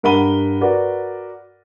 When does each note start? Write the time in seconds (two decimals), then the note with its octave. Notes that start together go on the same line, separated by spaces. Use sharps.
0.03 G2 A#4 F#5 B5 D#7 G7
0.61 F#4 A#4 B4 D5